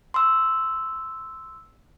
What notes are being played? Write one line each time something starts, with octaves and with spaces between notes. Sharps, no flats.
C6 E6